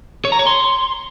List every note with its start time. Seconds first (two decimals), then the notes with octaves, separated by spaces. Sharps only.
0.25 C#5
0.32 A#5
0.39 C#5
0.47 C6